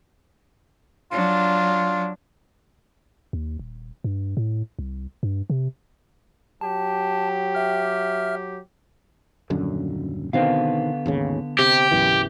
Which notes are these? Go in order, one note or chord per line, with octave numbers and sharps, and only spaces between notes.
F#3 D4 F4
D#2
D#1
G2
A2
C2
G2
C3
F#3 G4 A5
E5 F6
D#1 F#2 D3
B2 D3 D#3 B3 C4 F5
G#1 D#2 C#3
C3 G4
B1 F#2 E3